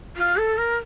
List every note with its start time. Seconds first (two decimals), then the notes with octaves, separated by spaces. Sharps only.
0.16 F4
0.37 A4
0.57 A#4